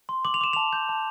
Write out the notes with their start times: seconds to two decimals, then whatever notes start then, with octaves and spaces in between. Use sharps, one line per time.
0.09 C6
0.25 D6 F#7
0.34 F7
0.41 D6 E7
0.53 A5 F7
0.73 G6
0.89 A5